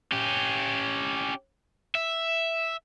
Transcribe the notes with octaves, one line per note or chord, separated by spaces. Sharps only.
C#4 G4
E5